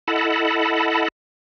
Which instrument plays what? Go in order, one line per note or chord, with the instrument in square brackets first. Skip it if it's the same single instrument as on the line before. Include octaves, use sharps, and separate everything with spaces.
[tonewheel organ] E4 A4 D#5 F#5 A5 B5